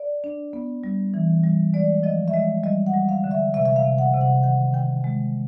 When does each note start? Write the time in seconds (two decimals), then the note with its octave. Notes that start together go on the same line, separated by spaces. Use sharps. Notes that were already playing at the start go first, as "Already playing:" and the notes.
Already playing: D5
0.24 D4
0.53 B3
0.84 G3
1.14 E3
1.44 G3
1.74 G#3 D5
2.03 F3 D#5
2.28 E5
2.34 G#3 D#5
2.63 G3 D#5
2.86 F#5
2.94 G3
3.09 F5
3.24 D3
3.31 E5
3.54 C3 E5
3.66 E5
3.76 F5
3.84 C3
3.98 F#5
4.14 C3
4.21 F#5
4.43 D#3 F#5
4.74 D#3 G5
5.04 G#3